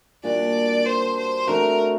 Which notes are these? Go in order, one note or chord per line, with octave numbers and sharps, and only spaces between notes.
A#2 G3 D4 F#4 D5
C5
C5
D3 A3 C4 F#4 A#4